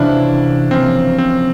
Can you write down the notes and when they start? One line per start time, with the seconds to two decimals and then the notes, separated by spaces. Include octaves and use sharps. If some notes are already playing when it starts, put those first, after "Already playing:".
Already playing: C3 E3 A3 C#4 D4 E4 F4
0.71 C3 F3 A#3 C4 C#4 F4
1.18 C4